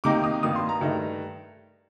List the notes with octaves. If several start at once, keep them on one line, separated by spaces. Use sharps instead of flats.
C3 D#3 A#3 D#4 D6
D#6
G2 D#3 A#3 D#6
C6
A#5
G2 D#3 A3 D#4